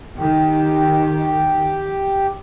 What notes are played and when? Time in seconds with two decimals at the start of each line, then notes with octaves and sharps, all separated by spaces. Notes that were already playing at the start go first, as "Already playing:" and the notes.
0.17 D#3 G4